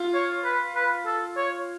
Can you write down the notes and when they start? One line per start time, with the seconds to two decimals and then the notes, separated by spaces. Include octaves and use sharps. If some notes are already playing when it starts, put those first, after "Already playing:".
Already playing: F4
0.14 C#5
0.44 B4
0.75 B4
1.06 A4
1.37 C#5